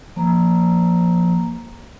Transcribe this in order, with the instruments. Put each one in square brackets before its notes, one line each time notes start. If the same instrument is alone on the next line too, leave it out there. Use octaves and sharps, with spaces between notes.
[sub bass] F3 [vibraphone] A#3 A#5